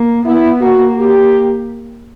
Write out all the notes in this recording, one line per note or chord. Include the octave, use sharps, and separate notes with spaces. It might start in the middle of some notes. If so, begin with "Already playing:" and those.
Already playing: A#3
B3 E4
A#3 F#4
G4